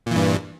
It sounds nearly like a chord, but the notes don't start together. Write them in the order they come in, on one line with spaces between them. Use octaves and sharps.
A#2 E3 G2